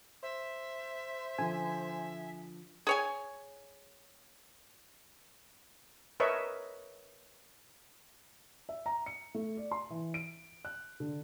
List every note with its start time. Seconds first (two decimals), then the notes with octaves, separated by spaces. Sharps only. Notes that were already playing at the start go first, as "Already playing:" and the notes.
0.23 C5 E5
1.38 D3 F3 G#5
2.87 G#4 C#5 G#5
6.20 A#4 B4 C#5 D#5 E5 C#6
8.69 E5
8.86 A#5
9.06 C#7
9.35 A3
9.57 D5
9.71 C6
9.91 E3
10.14 D7
10.65 F#6
11.00 D3